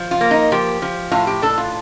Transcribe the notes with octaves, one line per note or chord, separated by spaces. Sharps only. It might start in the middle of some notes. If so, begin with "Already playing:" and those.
Already playing: F3
F4
A#3
D#4
F3 G4
F3
A2 F4
G4
D4 A4
F4